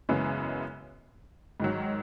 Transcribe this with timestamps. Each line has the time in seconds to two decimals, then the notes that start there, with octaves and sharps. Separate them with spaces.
0.09 F#2 C#3 E3 G#3 B3
1.60 G#2 D#3 F#3